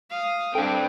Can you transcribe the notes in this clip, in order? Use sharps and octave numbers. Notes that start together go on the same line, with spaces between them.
F5 D#6
C4 D4 A4 G5